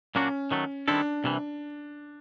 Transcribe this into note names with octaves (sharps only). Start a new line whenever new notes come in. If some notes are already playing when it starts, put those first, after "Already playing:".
A#2 F#3 A#3 C#4 D4 F#4
D#3 F#3 A3
D#3 G3 C4 D4 E4 A4
C2 C3 E3